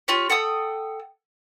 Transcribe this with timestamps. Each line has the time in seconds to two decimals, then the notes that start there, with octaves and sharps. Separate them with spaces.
0.08 F4 G4 C#5
0.30 A4 F#5 G5 D#6